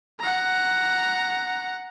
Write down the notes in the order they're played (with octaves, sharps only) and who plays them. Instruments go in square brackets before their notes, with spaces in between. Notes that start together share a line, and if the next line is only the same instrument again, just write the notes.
[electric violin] F#5 A#5